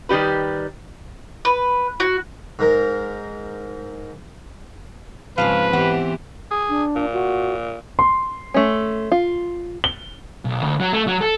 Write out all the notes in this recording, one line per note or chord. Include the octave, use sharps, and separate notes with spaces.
D#3 G3 G4 B4
B4
F#4
G#2 A#4
G#2 C#3 F3 G#3 C4 B4 C5 F5
E3 B3 C4 G4 C5 F#5
G#4
D4
A#2
F#4
C6
A3 C#4
F4
G7
B1
D2
F#3
A3
F#3
A4